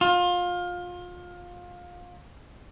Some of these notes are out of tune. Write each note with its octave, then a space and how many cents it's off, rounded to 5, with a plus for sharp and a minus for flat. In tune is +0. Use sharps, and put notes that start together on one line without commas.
F4 +25